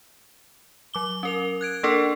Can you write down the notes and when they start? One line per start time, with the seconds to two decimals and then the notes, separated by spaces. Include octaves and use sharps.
0.94 F#3 D6 G7
1.23 C#4 A#4 F7
1.61 F#6 G#6 D7
1.83 A#3 D4 A4 A#4